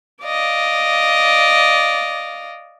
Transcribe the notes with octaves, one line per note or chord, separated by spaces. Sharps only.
D5 D#5 F5